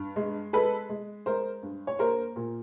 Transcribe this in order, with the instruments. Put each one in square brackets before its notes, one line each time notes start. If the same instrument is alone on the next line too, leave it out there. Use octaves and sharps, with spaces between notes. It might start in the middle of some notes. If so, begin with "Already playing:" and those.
Already playing: [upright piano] G2
G#3
G#3 A4 B4
G#3
G#3 A#4 C5
G2
C#5
A#3 A#4 C5
A#2